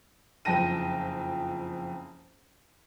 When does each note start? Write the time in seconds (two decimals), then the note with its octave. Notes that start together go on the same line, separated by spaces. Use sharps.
0.45 F#1 F2 G5 A5 A#6 D#7